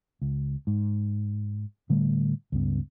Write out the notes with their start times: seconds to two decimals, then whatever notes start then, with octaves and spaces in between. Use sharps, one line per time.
0.22 C#2
0.67 G#2
1.89 A2 D3 G3 A3
2.52 C#2 G2 B3